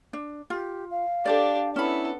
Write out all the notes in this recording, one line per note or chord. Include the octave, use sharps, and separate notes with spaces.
D4
F4 G4
F5
D4 G4 A4 C5 D5
B3 C#4 E4 A4 B5